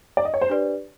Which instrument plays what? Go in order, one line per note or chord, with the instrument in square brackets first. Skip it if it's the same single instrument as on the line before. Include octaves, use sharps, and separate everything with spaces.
[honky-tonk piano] D5
D#5
C#5
C5
[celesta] D4 G4 B4 D5